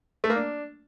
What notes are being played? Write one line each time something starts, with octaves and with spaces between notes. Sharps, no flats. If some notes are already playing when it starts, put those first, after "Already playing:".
A3
A#3
D4